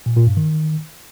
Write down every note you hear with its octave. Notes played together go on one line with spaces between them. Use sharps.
A#2
A#2
G2
D#3